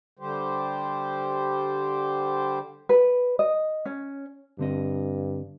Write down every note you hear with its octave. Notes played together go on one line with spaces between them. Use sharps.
D3 G3 G4 C5
B4
D#5
C#4
G2 D3 C4 D#5